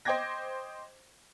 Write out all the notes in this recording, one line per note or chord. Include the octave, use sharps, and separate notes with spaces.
C5 D#5 G5 D6 G#6 A#6